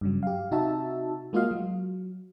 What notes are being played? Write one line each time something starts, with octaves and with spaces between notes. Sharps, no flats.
G2 C#3 F#3
G4 F5
C3 D#4 F#4 E5 A5
G#3 A#3 F4 F#4 D#5 F5
F#3